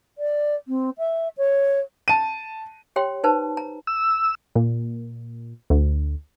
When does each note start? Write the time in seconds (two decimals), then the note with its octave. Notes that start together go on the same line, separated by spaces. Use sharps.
0.18 D5
0.68 C4
0.98 E5
1.37 C#5
2.08 A5 D#7
2.96 G4 C#5 G5 C6
3.24 D#4 B4 C5 A5
3.57 A#5
3.87 E6
4.55 A#2
5.70 D2